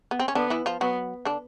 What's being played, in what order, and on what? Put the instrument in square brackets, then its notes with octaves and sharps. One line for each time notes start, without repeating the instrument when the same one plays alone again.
[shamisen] B3
C4
C#4
[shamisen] D3 D4 [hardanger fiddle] B3
[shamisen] E3 E4
F3 F4
[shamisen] F#3 F#4 [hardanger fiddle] B3
[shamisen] D3 D4